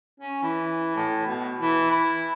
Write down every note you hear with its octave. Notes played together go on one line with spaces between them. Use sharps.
C#4
E3
A2
B2
E3
E4